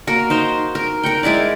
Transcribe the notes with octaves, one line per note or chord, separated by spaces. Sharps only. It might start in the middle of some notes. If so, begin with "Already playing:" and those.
A#3 F#4 A#4
D#4 C5 A#5
A#4
A#4 F#5 G5
G#3 E4 A#4 D5